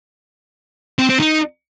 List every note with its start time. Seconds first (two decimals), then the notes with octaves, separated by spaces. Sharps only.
0.99 C4
1.09 C4
1.20 D#4